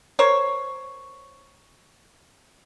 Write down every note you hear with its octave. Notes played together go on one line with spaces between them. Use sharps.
A#4 C5 C#5